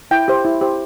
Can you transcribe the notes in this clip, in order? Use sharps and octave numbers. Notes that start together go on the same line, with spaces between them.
E4 G5
G4 C5
E4
G4 C5